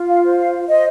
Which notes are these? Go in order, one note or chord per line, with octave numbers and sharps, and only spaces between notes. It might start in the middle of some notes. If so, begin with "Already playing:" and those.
Already playing: F4
F5
C5
F5
C5 D#5